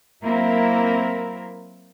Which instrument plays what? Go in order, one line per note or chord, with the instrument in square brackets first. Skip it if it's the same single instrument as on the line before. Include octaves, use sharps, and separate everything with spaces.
[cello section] F#3 A#3 C4 E4 A#4